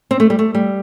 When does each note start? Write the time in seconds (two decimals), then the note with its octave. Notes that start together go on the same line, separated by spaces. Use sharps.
0.11 C4
0.20 A3
0.30 G3
0.39 A3
0.55 G3